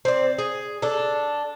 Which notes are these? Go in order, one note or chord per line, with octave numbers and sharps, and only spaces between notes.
C4 D5
G#4
D4 A4